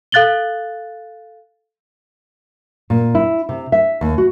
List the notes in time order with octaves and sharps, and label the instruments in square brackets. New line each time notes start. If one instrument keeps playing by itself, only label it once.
[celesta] A4 F5 F#6 A6 F#7 G7
[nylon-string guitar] A#2
E4
C3
E5
D#2
F#4